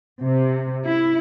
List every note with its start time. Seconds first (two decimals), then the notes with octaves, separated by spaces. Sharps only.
0.23 C3
0.85 E4